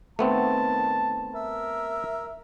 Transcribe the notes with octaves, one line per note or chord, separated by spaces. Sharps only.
D#3 A3 B3 C4 A5
A#4 E5